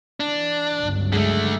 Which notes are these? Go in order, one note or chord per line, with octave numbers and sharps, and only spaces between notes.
E3 D4
G1 C#2 F#3
D3 G#3 A3